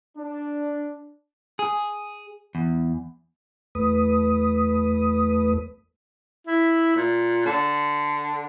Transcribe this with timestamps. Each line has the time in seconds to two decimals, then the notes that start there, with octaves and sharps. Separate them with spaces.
0.17 D4
1.59 G#4
2.55 E2
3.75 E2 A3 B4 D#6
6.47 E4
6.96 A#2
7.45 D3